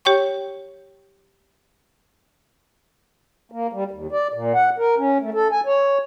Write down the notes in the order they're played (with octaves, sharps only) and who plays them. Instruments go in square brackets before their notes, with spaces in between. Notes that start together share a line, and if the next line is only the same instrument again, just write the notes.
[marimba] G4 C#5 G5 C#6
[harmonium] A#3
G3
D#2
D5
A#2
F#5
A#4
C#4
A3
A4
G#5
C#5